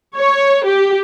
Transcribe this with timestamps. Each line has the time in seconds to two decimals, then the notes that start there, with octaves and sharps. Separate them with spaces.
0.16 C#5
0.64 G4